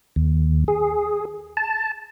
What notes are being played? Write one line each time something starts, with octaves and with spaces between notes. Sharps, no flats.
D#2
G#4
A5